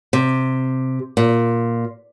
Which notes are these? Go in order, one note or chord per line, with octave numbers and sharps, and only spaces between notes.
C3
A#2